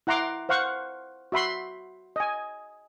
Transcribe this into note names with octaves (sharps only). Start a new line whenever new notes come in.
E4 F#5 A#5 C6 D6
C5 F5 F#5 C#6
F#4 E5 B5 C6
D#5 G#5